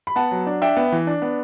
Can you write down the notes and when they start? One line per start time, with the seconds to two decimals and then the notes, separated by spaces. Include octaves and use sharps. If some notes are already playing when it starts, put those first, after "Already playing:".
0.07 B5
0.16 B3 F#5 A5
0.31 F#3
0.47 D4
0.62 D4 E5 G5
0.77 B3
0.92 E3
1.07 D4
1.22 B3